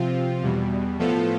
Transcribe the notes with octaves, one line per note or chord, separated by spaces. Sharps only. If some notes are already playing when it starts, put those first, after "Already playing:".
Already playing: C3 F3 C4 F4
E2 B2 G3
A2 F3 B3 F4 A4